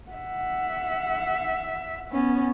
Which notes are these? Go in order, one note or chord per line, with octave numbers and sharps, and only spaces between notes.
E5 F#5
B3 C#4